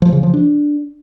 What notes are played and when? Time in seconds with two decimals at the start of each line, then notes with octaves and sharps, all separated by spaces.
0.02 F3
0.12 C#3
0.23 F3
0.34 D4